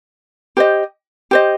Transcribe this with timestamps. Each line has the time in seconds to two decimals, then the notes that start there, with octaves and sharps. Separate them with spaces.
0.57 G4 C5 D#5
1.31 G4 C5 D#5